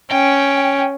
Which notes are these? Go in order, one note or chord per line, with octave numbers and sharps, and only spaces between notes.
C#4 G5